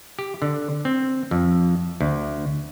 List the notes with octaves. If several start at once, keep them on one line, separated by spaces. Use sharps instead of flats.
G4
D3
C4
F2
D2